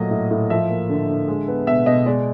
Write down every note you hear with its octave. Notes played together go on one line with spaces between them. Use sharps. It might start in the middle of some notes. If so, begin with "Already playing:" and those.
Already playing: A#2 F#3 A3 D#5
A2
A2
F3 E5
A#3
D3
D3
G#3
B3
B2 E5
B2 D#5
G#3 D5